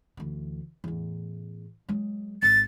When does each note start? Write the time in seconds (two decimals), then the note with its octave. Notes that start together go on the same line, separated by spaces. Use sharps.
0.17 D2 E3
0.84 E2 A2
1.89 F#3 G#3
2.42 G#1 A6